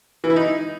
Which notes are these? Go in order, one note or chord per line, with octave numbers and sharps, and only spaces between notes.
E3
E4
D#4